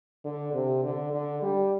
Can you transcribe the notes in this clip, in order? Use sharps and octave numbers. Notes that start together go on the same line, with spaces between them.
D3
C3
D3
D3
G3